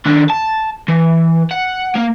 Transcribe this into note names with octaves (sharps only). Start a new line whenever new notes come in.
D#3 D4
A5
E3
F#5
A#3